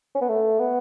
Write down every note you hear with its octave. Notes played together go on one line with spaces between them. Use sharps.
C#4
B3
A3
B3